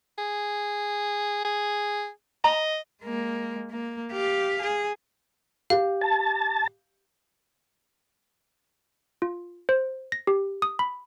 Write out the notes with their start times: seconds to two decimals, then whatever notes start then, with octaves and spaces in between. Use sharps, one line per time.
0.18 G#4
1.45 G#4
2.44 D#5 A#5
3.02 G#3 A#3
3.71 A#3
4.12 G4 F5
4.61 G#4
5.70 G4 F5
6.01 A5
9.22 F4
9.69 C5
10.12 A#6
10.27 G4
10.62 D#6
10.79 B5